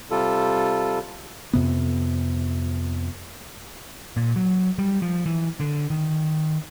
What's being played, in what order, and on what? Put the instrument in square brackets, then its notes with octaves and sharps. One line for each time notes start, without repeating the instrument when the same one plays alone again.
[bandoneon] C3 G3 F4 A4
[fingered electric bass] F2 C3 B3
[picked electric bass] A#2
F#3
G3
F3
E3
D3
D#3